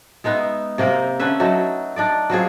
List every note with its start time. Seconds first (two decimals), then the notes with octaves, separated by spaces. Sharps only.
0.24 G#3 B3 D#4 E5
0.78 C3 A#3 C4 A#4
1.19 D3 C#4 B4 E5
1.40 F#3 A3 D#4
1.96 D4 D#4 D5
2.30 F#3 C4 F4 G#4